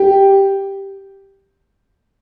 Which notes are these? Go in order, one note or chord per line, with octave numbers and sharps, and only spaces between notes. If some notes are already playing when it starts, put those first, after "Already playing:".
Already playing: G4